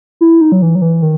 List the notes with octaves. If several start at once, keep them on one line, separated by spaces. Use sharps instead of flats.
E4
D#4
F#3
E3
F#3
E3
D#3